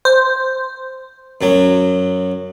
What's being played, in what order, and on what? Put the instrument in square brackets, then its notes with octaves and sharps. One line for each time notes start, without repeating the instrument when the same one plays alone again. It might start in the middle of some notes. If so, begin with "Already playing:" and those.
[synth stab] C5
[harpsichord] F#2 F#3